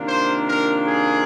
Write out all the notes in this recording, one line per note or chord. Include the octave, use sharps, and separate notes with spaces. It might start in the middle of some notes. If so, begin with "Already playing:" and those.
Already playing: C3 D#3 A#3 D4 F4
C5
A#4
G#4